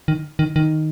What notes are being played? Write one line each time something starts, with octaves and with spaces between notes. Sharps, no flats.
D#3
D#3
D#3